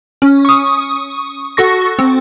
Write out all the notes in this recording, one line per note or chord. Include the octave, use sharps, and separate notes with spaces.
C#4
C#6 D#6
F#4 A4 C#6 A#6
C4